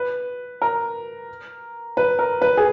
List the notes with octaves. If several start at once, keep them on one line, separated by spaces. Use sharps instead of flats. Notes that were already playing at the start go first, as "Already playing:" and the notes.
Already playing: B4
A#4
B4
A#4
B4
G#4